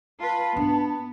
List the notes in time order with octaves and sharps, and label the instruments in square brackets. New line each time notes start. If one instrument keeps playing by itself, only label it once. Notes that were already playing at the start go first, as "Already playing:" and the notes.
[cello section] F4 B4 [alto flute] A5
[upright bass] G#2 D4 [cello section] B3